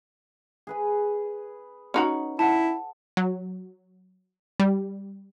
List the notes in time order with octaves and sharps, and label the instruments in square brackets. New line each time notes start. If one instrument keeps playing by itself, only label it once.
[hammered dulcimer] G#4 B4 G#5
[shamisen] C#4 D#4 F#4
[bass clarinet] E4 [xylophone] F#5 A5
[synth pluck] F#3
G3